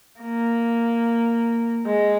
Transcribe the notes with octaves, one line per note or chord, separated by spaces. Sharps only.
A#3
G#3